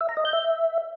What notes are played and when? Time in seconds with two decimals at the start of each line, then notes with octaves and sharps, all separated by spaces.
0.01 E5
0.09 A#5
0.17 D#5
0.25 G6
0.33 E5